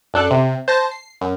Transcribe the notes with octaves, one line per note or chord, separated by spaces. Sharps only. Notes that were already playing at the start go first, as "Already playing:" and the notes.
F#2 D4 A4 F#6
C3
C5 A5 A#6
C7
F#2